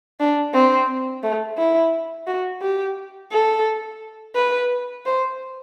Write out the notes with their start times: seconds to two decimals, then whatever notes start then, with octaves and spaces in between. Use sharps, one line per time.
0.20 D4
0.54 C4
1.23 A3
1.58 E4
2.27 F#4
2.62 G4
3.32 A4
4.35 B4
5.06 C5